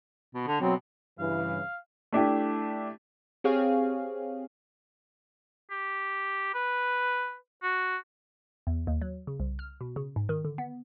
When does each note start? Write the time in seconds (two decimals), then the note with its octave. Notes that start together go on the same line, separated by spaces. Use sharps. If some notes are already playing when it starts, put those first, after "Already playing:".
0.35 B2
0.47 D3
0.61 B2 F#3 C4
1.19 G2 C#3 E3 F5
2.12 A3 D4 E4 G4
3.44 C4 G4 G#4 C#5 F5
5.71 G4
6.54 B4
7.63 F#4
8.67 E2
8.87 D#2
9.02 F#3
9.27 C#3
9.40 C2
9.59 F6
9.81 B2
9.96 C#3
10.16 G#2
10.29 D#3
10.45 D3
10.58 B3